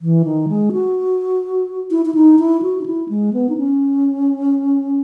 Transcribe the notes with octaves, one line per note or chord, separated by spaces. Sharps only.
E3
D#3
G#3
F#4
E4
E4
D#4
E4
F#4
D#4
E4
G#3
B3
D#4
C#4